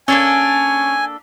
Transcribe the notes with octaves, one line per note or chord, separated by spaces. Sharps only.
A#3 C#4 D4 A4 G#5